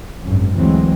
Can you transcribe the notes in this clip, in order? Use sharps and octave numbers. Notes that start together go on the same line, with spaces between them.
G#1 F#2
D2 E3 F#3 G#3 C4